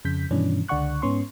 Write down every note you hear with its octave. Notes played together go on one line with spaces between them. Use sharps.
F2 C#3 G6 B6
G2 B2 D#3 E3 C#4 D4
C#2 D3 D5 F#5 C#6 F#6
G#2 B3 C#4 C6 C#6